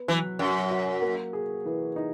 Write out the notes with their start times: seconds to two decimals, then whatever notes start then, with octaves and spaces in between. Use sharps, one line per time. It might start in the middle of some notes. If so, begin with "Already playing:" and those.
Already playing: B3
0.08 E3 F#3
0.39 F#2 F#3
0.71 F#4
1.02 A#3
1.33 G#4
1.65 E3
1.96 D#4